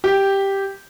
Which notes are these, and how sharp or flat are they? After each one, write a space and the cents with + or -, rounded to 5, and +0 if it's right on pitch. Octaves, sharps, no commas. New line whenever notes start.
G4 +0